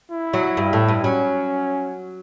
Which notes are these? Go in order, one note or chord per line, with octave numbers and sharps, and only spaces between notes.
E4
F#3
G2
A2
G2
F#3 C#4